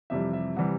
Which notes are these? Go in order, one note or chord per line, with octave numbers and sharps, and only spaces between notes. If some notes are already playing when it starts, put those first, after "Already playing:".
F2 C3 E3 G3 E5
E5
C3 E3 G3 F#5